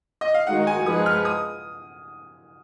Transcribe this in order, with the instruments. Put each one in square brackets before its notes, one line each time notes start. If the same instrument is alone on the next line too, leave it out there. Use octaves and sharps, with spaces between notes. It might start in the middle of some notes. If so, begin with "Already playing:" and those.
[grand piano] D#5
F5
[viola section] D#3 G#3 D#4 F#4 [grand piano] F#5
[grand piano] G#5
[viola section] F3 G#3 D#4 G#4 B4 [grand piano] D#6
[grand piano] F6
D#6